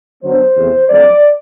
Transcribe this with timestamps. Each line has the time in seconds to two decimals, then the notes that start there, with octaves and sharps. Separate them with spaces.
0.23 F#2 D3 F#3 B3 D4 C5
0.56 E2 C3 E3 A3 C4
0.89 F2 D3 F#3 A3 C4 D5